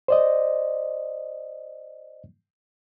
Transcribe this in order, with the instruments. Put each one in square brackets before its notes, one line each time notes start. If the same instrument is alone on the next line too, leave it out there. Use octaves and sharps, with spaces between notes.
[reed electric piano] C5 D5 D#5